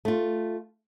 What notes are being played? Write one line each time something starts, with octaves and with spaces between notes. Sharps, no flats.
A3 F4